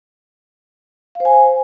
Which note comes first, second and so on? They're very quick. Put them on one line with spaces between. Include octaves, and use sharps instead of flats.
F5 C5 G#5